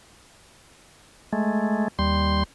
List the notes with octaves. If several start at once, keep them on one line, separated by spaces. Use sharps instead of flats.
G#3 A3
D#2 G3 C6